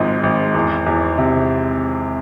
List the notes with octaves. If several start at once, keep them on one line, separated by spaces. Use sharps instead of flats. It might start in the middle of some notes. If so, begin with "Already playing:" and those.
Already playing: G#1 G#2 F3
G#1
E2
E2
C3